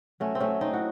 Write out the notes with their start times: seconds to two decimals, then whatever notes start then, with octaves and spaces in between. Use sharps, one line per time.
0.20 F#3 A3 C#4
0.35 C4
0.40 A3 C#4
0.48 F#3
0.61 C4 D#4
0.73 A2 F#4